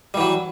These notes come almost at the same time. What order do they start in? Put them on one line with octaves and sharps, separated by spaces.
G3 E3 F#3